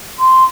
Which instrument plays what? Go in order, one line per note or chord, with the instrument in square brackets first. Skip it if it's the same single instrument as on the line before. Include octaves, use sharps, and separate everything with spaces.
[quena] C6